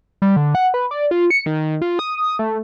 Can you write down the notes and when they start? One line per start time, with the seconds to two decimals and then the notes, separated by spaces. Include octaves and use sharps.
0.22 G3
0.36 D3
0.55 F#5
0.74 B4
0.91 D5
1.11 F4
1.30 C#7
1.46 D#3
1.82 F4
1.99 D#6
2.39 A3